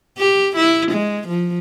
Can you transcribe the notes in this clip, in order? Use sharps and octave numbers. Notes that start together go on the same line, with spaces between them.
G4
E4
G#3
F3